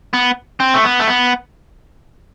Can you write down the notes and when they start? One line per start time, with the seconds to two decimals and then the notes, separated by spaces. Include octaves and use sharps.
0.14 B3
0.60 C4
0.74 A3
0.84 B3
1.00 A3
1.07 B3